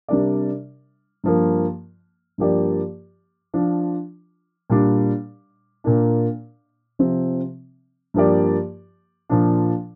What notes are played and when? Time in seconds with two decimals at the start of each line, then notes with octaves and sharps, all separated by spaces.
0.08 C3 G3 D4 A#4 D5
1.24 G2 F3 A#3
2.38 G2 F3 A#3 G4 D5
3.54 F3 D4 F4
4.70 A#2 G3 D4
5.84 A#2 A#3 D4
6.99 C3 F3 C4
8.14 G2 F3 A#3 G4 D5
9.29 A#2 F3 D4